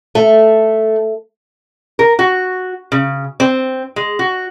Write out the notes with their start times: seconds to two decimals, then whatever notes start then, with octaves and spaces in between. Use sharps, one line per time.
0.15 A3
1.99 A#4
2.19 F#4
2.92 C#3
3.40 C4
3.96 G#3
4.19 F#4